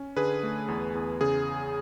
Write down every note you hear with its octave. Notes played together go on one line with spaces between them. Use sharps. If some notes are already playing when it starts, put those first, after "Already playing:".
Already playing: C#4
D3 G#4 B4
A3
E2
E2
C#3 G#4